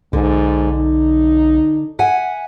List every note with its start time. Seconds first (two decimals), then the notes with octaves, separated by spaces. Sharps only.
0.13 B1 G#2 D3
0.73 D#4
1.99 E5 F#5 G#5